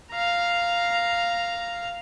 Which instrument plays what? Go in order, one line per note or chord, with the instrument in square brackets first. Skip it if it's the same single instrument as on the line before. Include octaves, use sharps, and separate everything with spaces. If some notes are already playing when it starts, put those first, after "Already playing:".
[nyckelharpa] F5 A#5